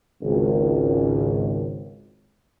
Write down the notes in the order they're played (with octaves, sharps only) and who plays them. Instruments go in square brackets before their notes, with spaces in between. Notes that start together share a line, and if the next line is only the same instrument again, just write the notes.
[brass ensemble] G#1 C#2